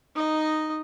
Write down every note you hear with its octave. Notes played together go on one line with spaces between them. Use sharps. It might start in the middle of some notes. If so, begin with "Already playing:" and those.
D#4 D#5